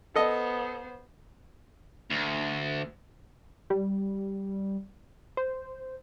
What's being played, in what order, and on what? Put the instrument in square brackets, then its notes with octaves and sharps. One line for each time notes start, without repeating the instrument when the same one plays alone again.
[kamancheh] B3 C5 [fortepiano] A4 D#5
[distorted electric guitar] D2
[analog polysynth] G3
C5